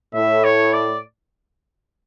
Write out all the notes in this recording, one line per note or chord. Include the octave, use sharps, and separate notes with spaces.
A2 E5
C#5
D5